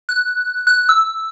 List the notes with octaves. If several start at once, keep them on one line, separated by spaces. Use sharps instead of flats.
F#6
F#6
E6